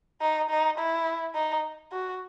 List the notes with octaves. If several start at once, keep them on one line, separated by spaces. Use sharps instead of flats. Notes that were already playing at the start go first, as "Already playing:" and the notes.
D#4
D#4
E4
D#4
F#4